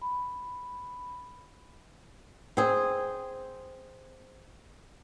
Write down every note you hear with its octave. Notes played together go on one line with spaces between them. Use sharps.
B5
C4 G#4